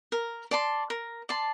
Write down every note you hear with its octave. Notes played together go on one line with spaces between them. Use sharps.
A#4
D5 A5 C6
A#4
D5 A5 C6